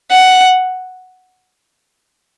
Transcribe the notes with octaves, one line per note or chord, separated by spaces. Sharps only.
F#5